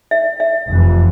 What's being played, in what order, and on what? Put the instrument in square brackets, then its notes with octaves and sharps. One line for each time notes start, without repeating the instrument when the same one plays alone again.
[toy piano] E5
E5
[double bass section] F1 F2 E3